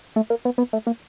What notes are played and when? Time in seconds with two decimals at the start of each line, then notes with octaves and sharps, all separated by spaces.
0.16 A3
0.30 A#3
0.45 B3
0.58 B3
0.73 A3
0.87 A#3